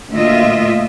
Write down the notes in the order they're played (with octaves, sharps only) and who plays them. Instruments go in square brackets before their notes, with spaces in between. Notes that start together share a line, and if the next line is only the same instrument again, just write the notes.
[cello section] D2 A#2 F4 D#5 E5